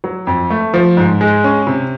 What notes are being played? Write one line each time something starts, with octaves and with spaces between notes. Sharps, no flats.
F#3
F2
A3
F3
G#2
G#3
C#4
C3